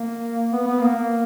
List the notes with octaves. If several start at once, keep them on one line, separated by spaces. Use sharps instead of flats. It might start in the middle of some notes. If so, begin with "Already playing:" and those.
Already playing: A#3
B3
B3
A#3
A#3